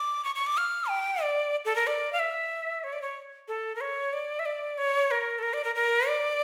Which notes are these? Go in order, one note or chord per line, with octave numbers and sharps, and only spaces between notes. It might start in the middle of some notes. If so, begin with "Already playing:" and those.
Already playing: D6
C#6
C#6
D6
F6
G5
D5
A4
A#4
D5
F5
E5
C#5
D5
C#5
A4
A#4
C#5
D5
E5
D5
C#5
A#4
A4
A#4
D5
A#4
A#4
D5